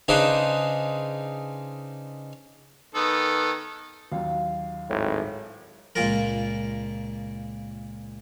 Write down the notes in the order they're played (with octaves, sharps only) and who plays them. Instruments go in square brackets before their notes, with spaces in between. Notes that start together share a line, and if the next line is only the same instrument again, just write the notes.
[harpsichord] C#3 D4 D#4 G#4 B4 C5
[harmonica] D#3 B3 A4
[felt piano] D#2 F#3 [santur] F4 F5
[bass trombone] G#1 [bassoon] A2
[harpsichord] C#2 A#2 A#3 F4 A#4